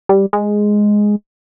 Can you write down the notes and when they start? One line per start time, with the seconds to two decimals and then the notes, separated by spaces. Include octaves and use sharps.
0.09 G3
0.33 G#3